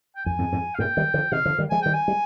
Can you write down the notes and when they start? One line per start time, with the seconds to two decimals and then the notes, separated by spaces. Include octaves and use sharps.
0.16 G5
0.26 F2 G#5
0.39 F2 G#2
0.52 F2 G#2
0.74 F5
0.78 G2 A#2 G5
0.97 D#3 G3
1.14 D3 F3
1.32 C3 D#3 F5
1.45 D3 F3
1.58 D#3 G3
1.70 F3 G#3 G#5
1.82 D#3 G3 G5
1.93 G#5
2.08 G3